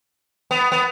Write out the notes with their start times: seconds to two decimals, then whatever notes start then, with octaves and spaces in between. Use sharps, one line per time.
0.51 B3
0.72 B3